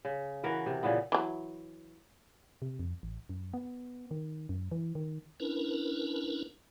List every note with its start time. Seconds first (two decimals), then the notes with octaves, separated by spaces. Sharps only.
0.05 C#3
0.44 E3 F#4 A#4 B4
0.66 C3
0.83 A#2 C#3 E3 B3
1.12 E3 F#3
2.62 C3
2.79 F2
3.03 A1
3.29 F#2
3.54 B3
4.11 D#3
4.49 F#2
4.72 E3
4.95 D#3
5.40 C#4 D4 E4 A#4 B4